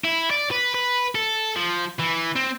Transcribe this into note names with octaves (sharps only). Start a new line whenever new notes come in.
E4
D5
B4
B4
A4
F3
E3
C4